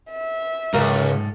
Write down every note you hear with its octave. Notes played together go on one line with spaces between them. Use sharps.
E5
C#2 G#2 A4 A#4 F5